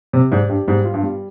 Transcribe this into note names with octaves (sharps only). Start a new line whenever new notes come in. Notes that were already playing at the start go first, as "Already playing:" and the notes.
C3 G4
G#2 D5
G2 G4
G#2 G3
F4
G2
G3